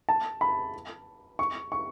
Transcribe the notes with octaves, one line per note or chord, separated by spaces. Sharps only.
A5
B5
C#6
C#6